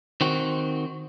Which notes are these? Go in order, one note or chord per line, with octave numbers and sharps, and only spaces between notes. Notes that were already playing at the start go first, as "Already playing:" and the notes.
D#3 C4 F#4